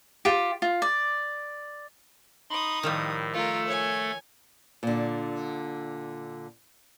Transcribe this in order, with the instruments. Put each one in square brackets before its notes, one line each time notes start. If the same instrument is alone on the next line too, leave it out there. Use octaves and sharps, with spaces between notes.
[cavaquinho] F4 G4
F4
D5
[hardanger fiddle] D#4 D#6 [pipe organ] B5 C6
[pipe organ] A2 [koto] D#3 F3 G3
[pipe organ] A3 A4 [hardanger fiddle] F4 A#4
[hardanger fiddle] C#5 G#5
[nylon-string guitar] A#2 D3